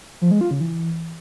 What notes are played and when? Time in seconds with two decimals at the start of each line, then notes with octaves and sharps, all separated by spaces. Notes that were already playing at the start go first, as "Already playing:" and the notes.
0.21 F3
0.31 G#3
0.41 F4
0.51 C#3
0.61 E3